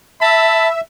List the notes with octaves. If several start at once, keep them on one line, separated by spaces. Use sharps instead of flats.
E5 A5 B5